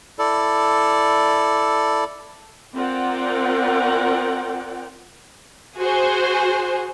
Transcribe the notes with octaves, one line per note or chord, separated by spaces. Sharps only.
E4 A4 D5
C4 F4 A#4 D5 F#5 G5
F#4 G#4 C5